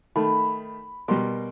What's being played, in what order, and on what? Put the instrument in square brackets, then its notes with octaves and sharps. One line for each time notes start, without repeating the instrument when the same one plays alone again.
[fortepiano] D#3 A3 [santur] B5
[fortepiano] B2 G3 [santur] A#4 C6